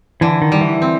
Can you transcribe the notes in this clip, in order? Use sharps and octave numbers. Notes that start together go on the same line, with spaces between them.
D3 E3
D#3
G3
E3
C4